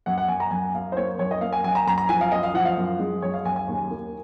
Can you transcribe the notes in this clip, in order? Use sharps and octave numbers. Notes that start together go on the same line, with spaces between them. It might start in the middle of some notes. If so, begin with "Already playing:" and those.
F#2 F#5
F#5
F#2 G#5
A#5
F#2 G#5
F#2 F5
C5
A#3 C#5
F#2 C#5
D#5
A#3 F5
G#5
F#2 G#5
A#5
F#2 A#5
A#5
F3 G#5
F5
F#2 D#5
F5
F3 F#5
F5
F#2
G#3
F#2 C#5
F5
F#2 G#5
G#5
D#2
A#3